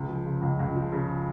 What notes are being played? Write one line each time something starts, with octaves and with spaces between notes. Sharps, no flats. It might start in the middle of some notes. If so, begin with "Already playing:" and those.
Already playing: C#2
F3
C#3
C#2
C#2
F3
C#3